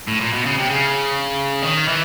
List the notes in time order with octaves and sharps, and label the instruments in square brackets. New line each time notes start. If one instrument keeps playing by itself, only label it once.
[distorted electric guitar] A2
A#2
B2
C#3
C3
C#3
D#3
E3